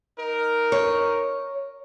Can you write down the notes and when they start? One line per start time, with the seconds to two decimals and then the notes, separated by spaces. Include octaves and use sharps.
0.19 D#4 A#4
0.72 C#5